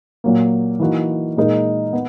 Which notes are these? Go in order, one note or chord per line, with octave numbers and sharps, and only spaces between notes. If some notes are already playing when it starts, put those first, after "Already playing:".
A#2 F#3 A#3
E3 A#3 D#4 F#4
A#2 G#3 D#4 A#4
B3